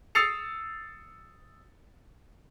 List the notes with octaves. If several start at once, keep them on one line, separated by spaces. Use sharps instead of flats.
D#6 E6 A6 C7 C#7 F7